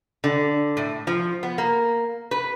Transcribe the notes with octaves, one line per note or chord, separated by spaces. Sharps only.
D3
A2
F3
B3
A#3
B4